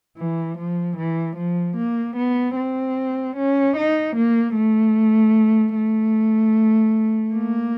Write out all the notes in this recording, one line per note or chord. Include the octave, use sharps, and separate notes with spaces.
E3
F3
E3
F3
A#3
B3
C4
C#4
D#4
A#3
A3
A3
A#3